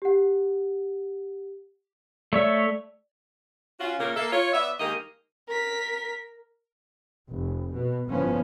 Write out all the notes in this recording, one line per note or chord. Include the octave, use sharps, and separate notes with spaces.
G4 F#5
A3 C#5 D5 E5
C#4 F4 F#4
A#2 C#3 A#3
A#3 A4 E5
F4 C#5
B3 C#5 D5 E5
D#3 G#3 A#3 G4 A#4 D#5
A#4 B6
F1
B2
G1 A2 C#3 F3 B3 C#4